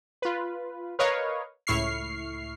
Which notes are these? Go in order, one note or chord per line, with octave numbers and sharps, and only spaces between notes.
F4 B4
A#4 B4 C#5 D#5 F5
C#2 A2 E4 C#6 F6 C7